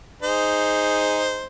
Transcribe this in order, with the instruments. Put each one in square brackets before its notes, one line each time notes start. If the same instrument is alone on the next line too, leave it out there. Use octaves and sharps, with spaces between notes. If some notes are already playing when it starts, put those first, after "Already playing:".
[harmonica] D#4 G#4 C5